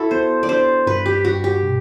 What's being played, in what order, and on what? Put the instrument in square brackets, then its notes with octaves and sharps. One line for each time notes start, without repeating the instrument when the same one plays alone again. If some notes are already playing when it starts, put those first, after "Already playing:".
Already playing: [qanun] E4 F#4 A4
[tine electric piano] B3 [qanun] C5
[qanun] D5
[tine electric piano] D4 [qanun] C5
[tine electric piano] G2 [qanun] B4
[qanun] G4
[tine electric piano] G2 [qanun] F#4
[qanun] G4
[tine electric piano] B2